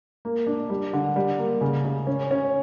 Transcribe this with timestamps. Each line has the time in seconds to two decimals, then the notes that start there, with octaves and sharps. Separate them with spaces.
0.25 A#3
0.47 D4
0.70 G3
0.93 D3
1.16 G3
1.39 A#3
1.61 C#3
1.85 C#3
2.07 C#4
2.31 C#4